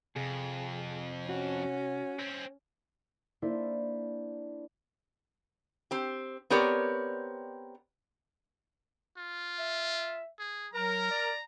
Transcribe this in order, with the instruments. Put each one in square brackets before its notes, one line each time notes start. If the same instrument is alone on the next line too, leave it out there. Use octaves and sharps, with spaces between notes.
[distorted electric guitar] F2 [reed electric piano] C3 [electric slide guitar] G#4
[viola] C#4 [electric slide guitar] F#4
[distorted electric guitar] C4 C#4
[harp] A#3 D4 E4 C5
[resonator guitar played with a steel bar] C4 G4
B3 C4 G4 A#4 C#5 D5
[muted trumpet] F4
[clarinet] E5
[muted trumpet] G#4
[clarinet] F#3 [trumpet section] A#4 [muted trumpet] A#5
[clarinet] D5